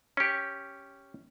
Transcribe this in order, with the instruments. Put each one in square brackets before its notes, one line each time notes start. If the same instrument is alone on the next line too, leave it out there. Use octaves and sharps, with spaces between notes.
[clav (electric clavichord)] C#4 G4